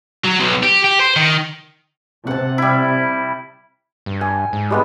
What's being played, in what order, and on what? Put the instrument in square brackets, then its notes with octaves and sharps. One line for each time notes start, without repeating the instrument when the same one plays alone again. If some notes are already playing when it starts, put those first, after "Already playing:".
[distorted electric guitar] F#3
B1
G4
G4
C5
D#3
[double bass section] C3 [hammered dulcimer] F#5 A5
[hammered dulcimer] G3 E4
[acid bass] G2
[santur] G#5
[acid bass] G#2
[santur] G3 G#3 B3